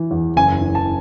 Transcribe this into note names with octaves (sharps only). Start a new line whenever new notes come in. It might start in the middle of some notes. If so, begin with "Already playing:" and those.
Already playing: E3
E2
F#1 G#5
E3
A5